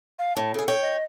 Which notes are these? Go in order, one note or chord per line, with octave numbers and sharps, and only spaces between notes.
F5
A2 A5
C#3 G#4 A4
C#5 G5
D#5